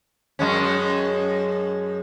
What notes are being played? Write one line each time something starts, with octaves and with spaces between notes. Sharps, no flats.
F#2 G#3 C#4